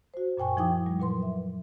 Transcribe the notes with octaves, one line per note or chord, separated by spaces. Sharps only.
F#4 C5
F#2 A#2 G5 G#5 C#6
F3 D#4 E4 G5 D6 D#6
G3
A#2 F#3 B4 C6
E5